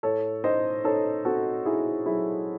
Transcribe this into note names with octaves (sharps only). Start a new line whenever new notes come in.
A2 A4 C#5
D#4 C5 D#5
D#4 A4 C#5
C4 F#4 A4
D#4 E4 G#4
F#3 E4 G#4